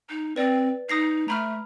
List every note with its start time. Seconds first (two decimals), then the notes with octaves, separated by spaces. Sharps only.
0.10 D#4
0.36 C4 B4 D5
0.89 D#4 D#6 A#6 C7
1.28 A3 A#5 B5 F6